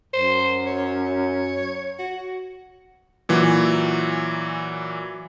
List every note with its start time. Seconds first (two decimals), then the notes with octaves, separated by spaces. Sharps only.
0.13 F#2 C5
0.67 C#5
1.99 F#4
3.29 A#2 E3 F#3